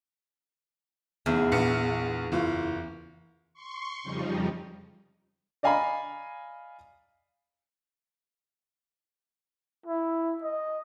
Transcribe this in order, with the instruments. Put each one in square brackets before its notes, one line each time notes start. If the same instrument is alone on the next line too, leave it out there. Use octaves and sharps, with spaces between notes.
[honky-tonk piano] F1 [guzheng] E2
[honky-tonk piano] A#1 B3 C#7
F#1 E3 F4
[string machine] C6 C#6
F2 C#3 F3 G3 D#4
[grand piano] D5 D#5 F5 G#5 A#5 B5
[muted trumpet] E4
D#5